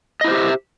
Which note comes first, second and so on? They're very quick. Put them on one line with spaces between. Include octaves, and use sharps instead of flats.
D#5 E4 C5 G4 E5